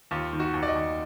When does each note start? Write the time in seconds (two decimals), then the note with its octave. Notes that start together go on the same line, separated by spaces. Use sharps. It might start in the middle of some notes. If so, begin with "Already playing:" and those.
0.11 D#2 F4
0.33 D#3
0.40 F#4
0.54 D#2
0.63 D5
0.68 D#5
0.75 D#2